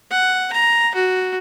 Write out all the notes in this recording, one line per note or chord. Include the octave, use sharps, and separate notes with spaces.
F#5
A#5
F#4